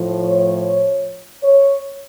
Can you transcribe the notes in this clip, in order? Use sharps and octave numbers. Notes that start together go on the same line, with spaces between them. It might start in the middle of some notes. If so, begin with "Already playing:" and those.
Already playing: A2 F3
C#5
C#5